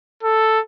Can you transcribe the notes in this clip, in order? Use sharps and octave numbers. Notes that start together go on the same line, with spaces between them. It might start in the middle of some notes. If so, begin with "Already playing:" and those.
A4